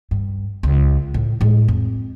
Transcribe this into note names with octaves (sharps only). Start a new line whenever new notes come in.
G2
C#2
A2
A2 G#3
F2